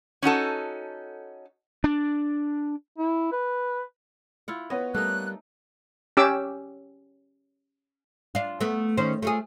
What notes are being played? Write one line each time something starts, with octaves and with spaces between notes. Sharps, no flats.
C#4 D#4 F#4 A4
D4
E4
B4
E4 F4 F#5
B3 B4 C#5 D#5
G3 A3 A#3 D#4 F#6
C#4 G4 D6 E6
D4 F4
A3 B3
D#3 C#4 C5
A3 F4 G#4